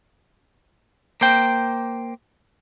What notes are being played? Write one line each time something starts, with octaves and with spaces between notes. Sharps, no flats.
A#3 C5 G5